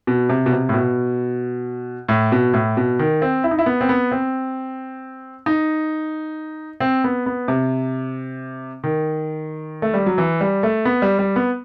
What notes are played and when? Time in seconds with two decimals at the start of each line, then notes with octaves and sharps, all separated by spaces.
0.07 B2
0.29 C3
0.46 B2
0.52 C3
0.69 A2
0.74 B2
2.09 A2
2.32 B2
2.53 A2
2.77 B2
2.99 D#3
3.22 C4
3.44 E4
3.51 D#4
3.59 E4
3.66 B3
3.81 C4
3.89 B3
4.12 C4
5.46 D#4
6.80 C4
7.04 B3
7.26 B3
7.48 C3
8.84 D#3
9.82 A3
9.94 G3
10.06 F#3
10.18 E3
10.41 G3
10.63 A3
10.85 B3
11.02 G3
11.19 G3
11.36 B3